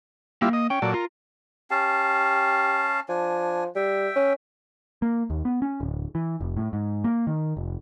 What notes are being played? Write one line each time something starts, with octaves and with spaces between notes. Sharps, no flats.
G3 A#3 E4 F4
D#5
C#4 G5
A#2 F#3 A4 D5
F4 A#4
C#4 G4 F5 A5
F3 D4 G#5
G3 E5 G5
C#4
A#3
D#2
B3
C#4
D1
E3
F1
A2
G#2
A#3
D#3
F1